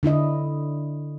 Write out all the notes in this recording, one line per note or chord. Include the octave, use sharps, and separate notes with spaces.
D3 D4 E4 D#5